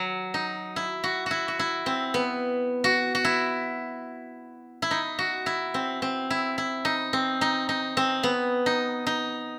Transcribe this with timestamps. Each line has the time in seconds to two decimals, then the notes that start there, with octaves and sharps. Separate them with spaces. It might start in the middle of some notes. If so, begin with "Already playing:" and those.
Already playing: F#3
0.34 D#4
0.76 E4
1.04 F#4
1.26 E4 F#4
1.48 F#4
1.59 E4
1.86 C4
2.14 B3
2.84 F#4
3.15 F#4
3.25 E4
4.82 E4
4.91 D#4
5.19 F#4
5.46 E4
5.74 C4
6.02 C4
6.30 E4
6.58 E4
6.85 D#4
7.13 C4
7.41 D#4
7.69 D#4
7.97 C4
8.23 B3
8.66 D#4
9.07 D#4